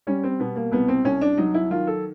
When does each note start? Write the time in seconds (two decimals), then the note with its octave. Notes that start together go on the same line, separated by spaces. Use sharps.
0.07 G3 C#4
0.24 C4
0.39 B2 B3
0.56 A#3
0.72 C2 B3
0.88 C4
1.04 C2 C#4
1.21 D4
1.38 F#3 D#4
1.54 E4
1.71 D#3 F4
1.87 A4